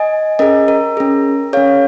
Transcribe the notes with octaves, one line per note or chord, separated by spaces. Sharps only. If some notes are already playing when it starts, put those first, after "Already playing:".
Already playing: D#5 G#5
C#4 G#4 A#4 D#5
A#4
C#4 G#4
C#4 G#4 C#5 F5